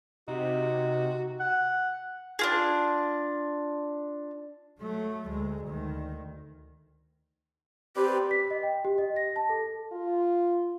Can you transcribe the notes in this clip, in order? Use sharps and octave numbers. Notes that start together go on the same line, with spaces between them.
C3 D#4 F#4
F#5
D4 F4 G#4
F#3 A3
D2 G#3
D2 D#3
C4 G4 B4 D5
B6
D#5
G5
G4
D#5
A#6
A5
A4
F4